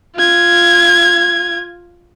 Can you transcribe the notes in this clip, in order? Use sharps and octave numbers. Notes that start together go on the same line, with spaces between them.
F4 G#6